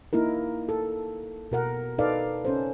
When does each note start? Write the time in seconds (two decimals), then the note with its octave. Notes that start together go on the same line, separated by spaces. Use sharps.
0.13 A#3 D#4 E4 A#4
0.69 A4
1.52 B2 A#4 F#5
1.98 D#4 A4 B4 D5 F5
2.45 C#4 A4 C5